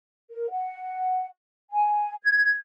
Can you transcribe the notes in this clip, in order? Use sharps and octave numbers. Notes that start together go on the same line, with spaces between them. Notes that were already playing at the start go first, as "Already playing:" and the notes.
A#4
F#5
G#5
G#6